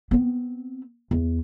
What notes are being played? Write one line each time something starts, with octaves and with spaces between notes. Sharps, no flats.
B3 C4
E2